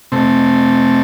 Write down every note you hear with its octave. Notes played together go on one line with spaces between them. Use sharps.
C3 A3 C4